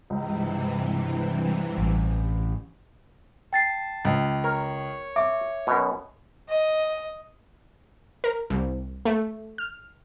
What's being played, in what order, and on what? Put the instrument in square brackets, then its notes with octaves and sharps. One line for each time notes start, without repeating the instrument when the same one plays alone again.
[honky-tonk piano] C#2 [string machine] G2 C3 E3
[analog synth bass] A1
[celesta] G5 A6 C7 [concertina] A5
[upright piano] C#2
[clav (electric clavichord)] A#4 [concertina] C#5
[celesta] E5 [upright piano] D6
[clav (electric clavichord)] F#2 B2
[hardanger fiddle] D#5
[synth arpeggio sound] A#4
C2
A3
F6